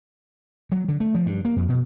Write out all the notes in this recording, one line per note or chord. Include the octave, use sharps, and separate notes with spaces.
F#3
D3
A3
F3
G2
A#3
F2
B2